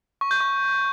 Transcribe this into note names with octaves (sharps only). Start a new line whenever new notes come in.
C#6
G6
C#6